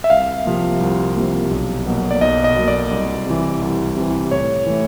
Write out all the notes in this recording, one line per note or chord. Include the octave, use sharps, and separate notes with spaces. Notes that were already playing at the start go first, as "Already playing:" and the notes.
E5
C2 F5
C3 F3 A#3
C2
C3 F3 A#3
B1
B2 F#3 A#3
D5
B1 D#5
D#5
B2 F#3 A#3
D5
C2
C3 E3
C2
C3 E3
A2 C#5
E3 A3